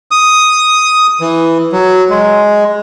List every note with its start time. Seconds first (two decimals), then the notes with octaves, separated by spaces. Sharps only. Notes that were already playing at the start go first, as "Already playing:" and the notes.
0.11 D#6
1.21 E3
1.72 F#3
2.10 G#3